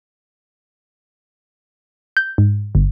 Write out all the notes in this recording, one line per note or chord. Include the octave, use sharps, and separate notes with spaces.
G6
G#2
G1